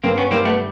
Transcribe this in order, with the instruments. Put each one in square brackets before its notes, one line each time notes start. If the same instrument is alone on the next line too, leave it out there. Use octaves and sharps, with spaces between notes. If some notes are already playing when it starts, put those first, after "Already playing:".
[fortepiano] G2 [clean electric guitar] A#3 C4
[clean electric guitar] B3 C#4
[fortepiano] G3 [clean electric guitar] A#3 C4
[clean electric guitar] A3 B3